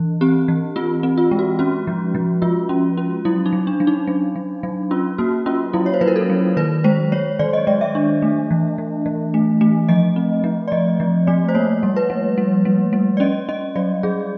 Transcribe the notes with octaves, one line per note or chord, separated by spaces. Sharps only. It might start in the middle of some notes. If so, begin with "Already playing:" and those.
Already playing: E3
C4 G4
E3
C4 F4
C4
F4
G#3
F#4
C#4 F#4
F3
F3
F3 F4
C#4
C#4
F#3 E4
D#4
F#3
D4
F#3
D#4
F#3
F#3
F#3
C#4 F4
A#3 F#4
C#4 F4
F#3 E4
C#5
C5
F#3 B4
A#4
A4
F#3
D#3 B4
G#3 C5
G#3 C#5
D#3 D5
D#5
G#3 D5
E5
D4
A3
E3
E3
E3
A3
A3
F3 D#5
C4
F3
D5
F3 D#5
F3
A3 D5
C5
A#3 C#5
G3
B4
G3
G3
G3
G3
D5
C#4 D#5
C#4 D#5
F#3 D5
F#3 G#4